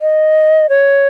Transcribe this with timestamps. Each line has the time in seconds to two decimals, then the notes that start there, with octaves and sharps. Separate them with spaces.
0.01 D#5
0.69 C#5